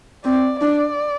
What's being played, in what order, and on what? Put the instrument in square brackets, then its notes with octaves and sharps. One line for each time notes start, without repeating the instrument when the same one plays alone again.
[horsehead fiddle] C4 [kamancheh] D5
[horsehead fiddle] D4 [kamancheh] D5